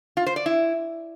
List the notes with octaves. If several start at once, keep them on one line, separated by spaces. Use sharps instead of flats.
F4
C5
D5
E4